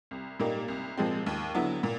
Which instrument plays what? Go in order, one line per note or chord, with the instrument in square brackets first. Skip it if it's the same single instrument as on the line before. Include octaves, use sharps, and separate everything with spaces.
[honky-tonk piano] C2
A#2 G3 A#3 D#4
C2
A#2 F3 G#3 C4
D#2
D3 F#3 B3 E4
A#2